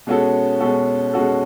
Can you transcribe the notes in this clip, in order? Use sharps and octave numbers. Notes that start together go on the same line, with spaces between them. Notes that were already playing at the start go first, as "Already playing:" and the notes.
B2 G#3 C#4 F#4 A4
B2 G#3 C#4 F#4 A4
B2 G#3 C#4 F#4 A4